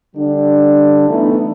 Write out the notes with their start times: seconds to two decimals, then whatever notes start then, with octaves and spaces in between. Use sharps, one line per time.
0.16 D3 G3 D4
1.08 E3 A3 B3 D#4